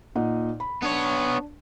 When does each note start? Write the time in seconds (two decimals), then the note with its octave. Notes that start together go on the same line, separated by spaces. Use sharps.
0.16 A#2 D#4 F#5
0.60 B5
0.82 B3 D4 C#5